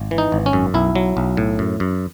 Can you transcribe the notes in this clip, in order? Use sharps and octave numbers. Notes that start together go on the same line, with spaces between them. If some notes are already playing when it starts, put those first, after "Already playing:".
Already playing: G#1
E3
D#4
G#1
C#4
F#2
B1 E4
F#3
B1
A2
F#2
F#2